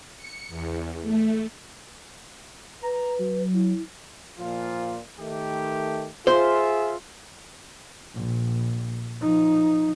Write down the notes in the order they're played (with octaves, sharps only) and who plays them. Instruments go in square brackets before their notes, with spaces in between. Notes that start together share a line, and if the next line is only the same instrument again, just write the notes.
[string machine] C#7
E2
A3
[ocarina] B4 [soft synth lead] A#5
[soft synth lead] F#3
[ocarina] E4
[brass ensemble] A#2 F3 F4
D#3 A3 G4
[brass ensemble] F4 G#4 E5 [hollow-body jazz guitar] C5
[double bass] A#1
F3 D#4